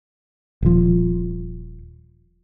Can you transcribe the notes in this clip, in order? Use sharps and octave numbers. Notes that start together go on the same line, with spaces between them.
D#1 F3